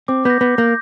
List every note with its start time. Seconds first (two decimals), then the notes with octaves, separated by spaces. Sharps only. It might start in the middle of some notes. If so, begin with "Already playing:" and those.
0.08 C4 D6
0.25 B3 G6 A#6
0.41 B3 D6
0.58 A#3 G6 A#6